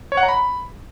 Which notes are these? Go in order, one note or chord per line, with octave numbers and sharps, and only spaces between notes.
C#5
F#5
A#5
B5